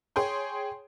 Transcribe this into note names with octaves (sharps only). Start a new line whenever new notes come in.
G#4 C#5 G5 C6